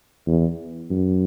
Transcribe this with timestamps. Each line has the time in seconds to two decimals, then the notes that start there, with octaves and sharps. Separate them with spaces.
0.27 E2
0.90 F#2